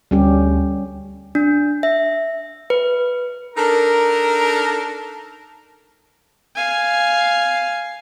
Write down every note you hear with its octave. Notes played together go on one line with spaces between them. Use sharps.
D2 G3 C#4 G4
D4
E5
B4
D4 D#4 A4 A#4
F5 G#5